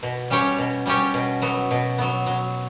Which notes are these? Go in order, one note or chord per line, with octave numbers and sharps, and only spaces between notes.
B2
G3 C#4 G4 C#5
B2
G3 C#4 G4 C#5
B2
F#3 B3
B2
F#3 B3
F#3